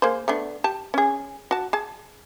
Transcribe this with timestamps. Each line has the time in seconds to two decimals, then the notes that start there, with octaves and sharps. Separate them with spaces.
0.02 A#3 G#4 C5
0.28 A3 B3 D4
0.64 G4 A5
0.94 C#4 G#4
1.51 F#4 A5
1.73 G#4 A5